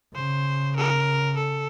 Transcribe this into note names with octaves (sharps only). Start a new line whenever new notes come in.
C#3 C5
A#4
A4